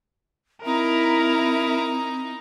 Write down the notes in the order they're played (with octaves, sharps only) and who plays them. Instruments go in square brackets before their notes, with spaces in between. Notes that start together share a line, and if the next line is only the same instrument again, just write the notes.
[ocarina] C4 [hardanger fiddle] D#4 A#5 [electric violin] E4 A#4